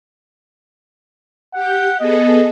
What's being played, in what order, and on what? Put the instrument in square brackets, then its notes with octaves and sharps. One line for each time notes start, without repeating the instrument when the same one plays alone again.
[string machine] G4 G6 [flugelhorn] F#5
[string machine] B3 G#4 A4 [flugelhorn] D#5